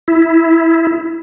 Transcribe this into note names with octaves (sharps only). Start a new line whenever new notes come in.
E4